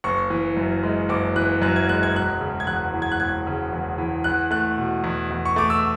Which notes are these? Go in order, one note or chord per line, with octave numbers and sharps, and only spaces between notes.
F#1 C#6
E3
F#2
G#3
F#1 D6
E3 F#6
F#2 F#6
G#6
G#3 F#6
G#6
E1 F#6
C#3
G#6
E2 F#6
E3
G#6
F#6
E1 G#6
C#3
E2
E3
E2 F#6
A3 F#6
B2
E2
E2
C#6
A3 D6
E6